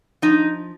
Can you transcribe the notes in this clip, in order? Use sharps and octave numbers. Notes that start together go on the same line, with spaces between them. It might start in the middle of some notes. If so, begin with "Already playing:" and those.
F3 D#4